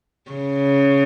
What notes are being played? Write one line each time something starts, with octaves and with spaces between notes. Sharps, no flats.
C#3